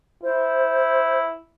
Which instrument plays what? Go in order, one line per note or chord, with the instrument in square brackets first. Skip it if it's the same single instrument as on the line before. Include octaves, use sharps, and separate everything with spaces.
[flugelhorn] E4 [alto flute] C5